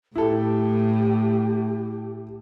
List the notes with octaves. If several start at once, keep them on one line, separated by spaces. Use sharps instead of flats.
A2 E4 G4 A4